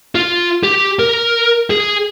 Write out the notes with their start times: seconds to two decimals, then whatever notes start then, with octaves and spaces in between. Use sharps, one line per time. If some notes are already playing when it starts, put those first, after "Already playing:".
0.15 F4
0.63 G4
0.99 A#4
1.70 G#4